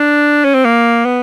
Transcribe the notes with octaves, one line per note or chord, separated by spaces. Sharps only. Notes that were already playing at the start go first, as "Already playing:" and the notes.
Already playing: D4
C#4
C4
A#3
B3